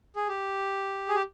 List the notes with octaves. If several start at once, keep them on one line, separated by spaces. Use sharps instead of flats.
G#4
G4
G#4
G4